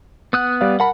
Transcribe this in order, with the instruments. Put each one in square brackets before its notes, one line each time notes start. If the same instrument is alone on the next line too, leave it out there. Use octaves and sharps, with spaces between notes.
[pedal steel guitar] B3 D#6 F#6 [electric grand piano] F#5
[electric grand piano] G3 D5 F5
[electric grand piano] A#4 A5 B5 [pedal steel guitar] F#5